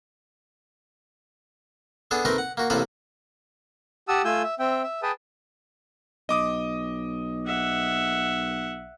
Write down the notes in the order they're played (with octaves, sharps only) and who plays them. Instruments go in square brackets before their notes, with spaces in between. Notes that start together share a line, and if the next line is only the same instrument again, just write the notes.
[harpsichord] B3 D4 G#4 A4
A3 C4 D#4 G4 A#4 B4
F#5
A#3 F#4
A1 C3 A#3 A4 B4 B5
[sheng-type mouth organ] G4 F#5 A5 D#6 E6
A3 F4 G#5 E6 G6
E5
C4 E5 G5
E5
G#4 B4 G5 A5 D#6
[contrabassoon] B1 [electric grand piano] D#5 D6 D#6
[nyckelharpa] E5 F#5